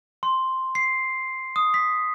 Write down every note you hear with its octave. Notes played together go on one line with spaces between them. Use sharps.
C6
C7
D#6
B6